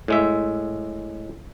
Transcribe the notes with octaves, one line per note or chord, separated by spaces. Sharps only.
A2 G#3 E5